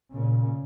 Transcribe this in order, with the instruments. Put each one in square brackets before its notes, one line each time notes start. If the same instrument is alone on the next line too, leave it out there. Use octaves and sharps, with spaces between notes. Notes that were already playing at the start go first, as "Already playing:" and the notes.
[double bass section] A#2 C#3